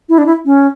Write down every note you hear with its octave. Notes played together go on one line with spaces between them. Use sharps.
E4
D4
E4
C#4